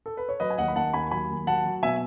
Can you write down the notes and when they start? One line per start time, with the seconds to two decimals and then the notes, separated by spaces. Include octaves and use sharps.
0.06 A4
0.17 B4
0.29 C#5
0.40 F#3 B4 D#5
0.50 G#5
0.58 D#2 D#5 F#5
0.68 B5
0.75 D#2 F#5 A5
0.93 D#2 G#5 B5
1.11 F#3 G#5 B5
1.29 D#2
1.47 F#3 F#5 A5
1.65 F#3
1.83 B2 E5 G#5